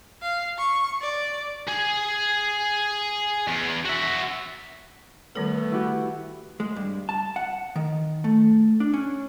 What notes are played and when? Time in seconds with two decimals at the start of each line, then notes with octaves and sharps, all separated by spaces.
0.22 F5
0.58 C#6
1.02 D5
1.67 G#4
3.47 E2
3.85 F#4 E5
5.36 D#3 G3 A3 B3 A4
5.72 E4 F#4 G4
6.60 G#3
6.76 G2
7.09 A5
7.36 F#5
7.76 D#3
8.24 A3
8.80 D4
8.94 C#4